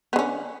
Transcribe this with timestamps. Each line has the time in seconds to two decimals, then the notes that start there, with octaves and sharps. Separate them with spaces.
0.13 B3
0.16 D3
0.19 C#4